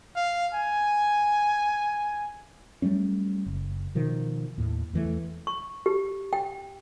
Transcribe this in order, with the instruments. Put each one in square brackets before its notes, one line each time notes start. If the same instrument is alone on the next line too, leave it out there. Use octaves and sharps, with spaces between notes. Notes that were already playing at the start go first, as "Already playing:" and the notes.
[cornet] F5
G#5
[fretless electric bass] F#3 G3 A3 C#4
F#1
B2 D#3 F3
D#2 A2
E2 E3 A3
[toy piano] C#6
G4
G5